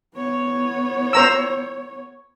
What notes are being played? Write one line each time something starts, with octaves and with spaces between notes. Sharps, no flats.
B3 C#5
C5 A#5 E6